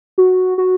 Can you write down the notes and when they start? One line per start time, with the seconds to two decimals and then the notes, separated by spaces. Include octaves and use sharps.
0.18 F#4
0.58 F#4